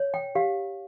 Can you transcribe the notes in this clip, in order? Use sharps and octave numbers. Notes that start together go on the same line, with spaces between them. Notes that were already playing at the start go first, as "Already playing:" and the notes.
Already playing: C#5
G5
G4 F5